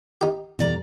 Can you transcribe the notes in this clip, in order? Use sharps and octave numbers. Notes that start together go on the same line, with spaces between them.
D#4 G4
E2 B2 E3 G3 D5 A#5